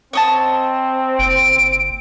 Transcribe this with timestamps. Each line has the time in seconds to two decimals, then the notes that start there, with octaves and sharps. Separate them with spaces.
0.13 C4 C#5 D#5 A5
1.19 F#1 D7